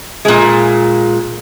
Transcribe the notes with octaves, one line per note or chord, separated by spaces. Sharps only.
A#2 G#3